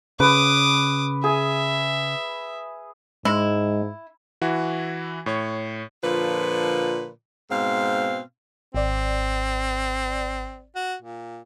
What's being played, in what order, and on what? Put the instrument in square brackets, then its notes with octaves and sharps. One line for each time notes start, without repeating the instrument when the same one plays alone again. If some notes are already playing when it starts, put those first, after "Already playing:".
[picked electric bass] C#3 [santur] B4 [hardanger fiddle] D6 D#6
[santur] G#4 [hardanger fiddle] E5
[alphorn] G#2 [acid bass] G#3 [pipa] E4
[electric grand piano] E3 E4 F#4
A2 C#5 C#6
[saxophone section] A#2 D3 F3 F4 B4
G#2 B2 C4 F5
[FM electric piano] G#1 D5 [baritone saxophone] C4
[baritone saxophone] F#4
A#2